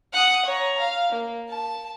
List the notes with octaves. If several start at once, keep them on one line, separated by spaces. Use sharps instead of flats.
F#5 D#6
C#5 A#5
F5
A#3
A5